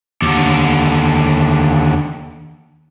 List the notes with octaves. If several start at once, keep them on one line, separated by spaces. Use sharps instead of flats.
D#2 D3